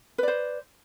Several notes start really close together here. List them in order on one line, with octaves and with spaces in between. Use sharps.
B4 D5 C5